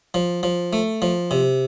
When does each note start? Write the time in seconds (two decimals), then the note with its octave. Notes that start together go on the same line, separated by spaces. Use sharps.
0.14 F3
0.43 F3
0.73 A3
1.02 F3
1.31 C3